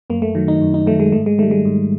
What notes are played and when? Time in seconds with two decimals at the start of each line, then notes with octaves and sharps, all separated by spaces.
0.10 F#2 A#3
0.22 A3
0.35 D#3 F#3
0.48 D#4
0.61 F#2
0.74 D#4
0.87 D#3 F#3 A3
1.00 G#3
1.12 G#2 A3
1.26 G#3
1.38 D#3 G3 A3
1.51 G#3
1.65 G#2